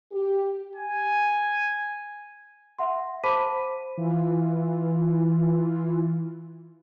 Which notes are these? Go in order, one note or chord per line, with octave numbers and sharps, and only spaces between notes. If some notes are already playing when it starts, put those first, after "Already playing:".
G4
G#5
E5 F#5 C6
C5 A5 B5 D6 B6 D#7
E3 F4